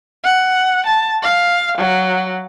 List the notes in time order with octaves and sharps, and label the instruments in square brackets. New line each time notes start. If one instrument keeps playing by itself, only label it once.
[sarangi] F#5
A5
F5
F#3